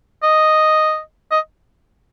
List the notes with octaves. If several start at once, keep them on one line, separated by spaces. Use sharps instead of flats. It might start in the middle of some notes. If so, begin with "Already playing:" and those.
D#5
D#5